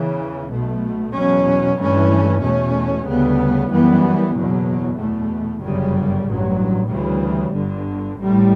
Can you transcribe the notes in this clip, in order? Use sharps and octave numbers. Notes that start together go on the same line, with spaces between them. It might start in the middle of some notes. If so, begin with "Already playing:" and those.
Already playing: E2 C#3 E3
B1 B2 A3
E2 B2 F#3 C#4
G2 E3 A3 C#4
E2 B2 A3 C#4
D2 C#3 G3 B3
F#2 E3 G3 B3
F#1 E2 B2 F#3
E2 B2 A3
G1 F#2 C#3 G3
A1 G2 F#3
D2 C#3 E3 G3
G1 G2 D3
A1 A2 G3